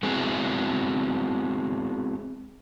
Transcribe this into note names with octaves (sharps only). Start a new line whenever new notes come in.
G#3 B3 C4 E4 F#4 G#4